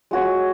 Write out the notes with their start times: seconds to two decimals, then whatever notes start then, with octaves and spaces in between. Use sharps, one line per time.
0.11 G#3 F#4 C#5